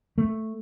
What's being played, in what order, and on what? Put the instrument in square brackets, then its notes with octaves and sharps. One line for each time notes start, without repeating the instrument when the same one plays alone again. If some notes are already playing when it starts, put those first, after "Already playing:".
[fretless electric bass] A3